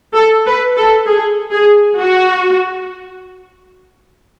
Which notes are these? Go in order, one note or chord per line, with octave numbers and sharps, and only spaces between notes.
A4
B4
A4
G#4
G#4
F#4